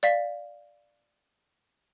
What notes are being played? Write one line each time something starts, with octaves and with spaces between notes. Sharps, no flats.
D5 F5 B6